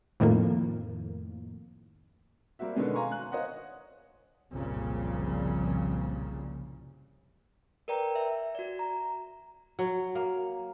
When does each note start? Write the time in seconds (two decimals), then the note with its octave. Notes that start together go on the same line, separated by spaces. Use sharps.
0.20 F2 A2 D#3 A#3
2.59 G3 A#3 C4 F#4 E5
2.75 B2 D3 D#3 G#3 B3 C#4
2.95 F5 G#5 A#5 C6 C#6
3.12 F#6
3.32 C5 C#5 D#5 F5 F#5
4.53 F#1 C2 A#2 C#3 F3 G3
7.88 A#4 B4 D5 G5 A#5
8.15 E5
8.55 F#4 D5
8.79 A#5
9.79 F#3
10.15 A#3